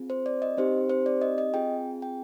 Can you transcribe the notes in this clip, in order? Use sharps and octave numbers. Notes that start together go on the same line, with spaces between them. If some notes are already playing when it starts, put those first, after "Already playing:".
Already playing: C4 F4 G#4
C5
D5
D#5
C4 D#4 G4 C5
C5
D5
D#5
D#5
C4 F4 G#4 G5
G5